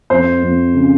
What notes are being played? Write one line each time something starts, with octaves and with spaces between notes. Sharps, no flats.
F2 C5
F2
C#3